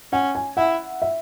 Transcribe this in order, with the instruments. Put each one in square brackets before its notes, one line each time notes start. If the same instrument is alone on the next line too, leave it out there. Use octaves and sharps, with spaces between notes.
[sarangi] C#4 [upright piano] F#5
[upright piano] G#5
[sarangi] E4 [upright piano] F#5
[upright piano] E5